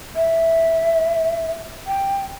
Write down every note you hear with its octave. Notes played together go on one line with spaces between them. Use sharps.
E5
G5